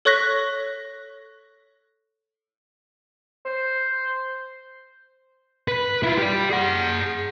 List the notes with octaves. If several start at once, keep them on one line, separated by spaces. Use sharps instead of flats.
A4 C#5 C#6 F#6 A#6 B6
C5
B4
E4 F4
G4 D5
G#4 F#5